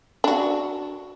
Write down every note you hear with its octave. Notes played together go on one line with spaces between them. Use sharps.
D4 F#4